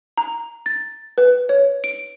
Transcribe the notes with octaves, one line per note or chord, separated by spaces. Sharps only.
A#5
A6
B4
C#5
D7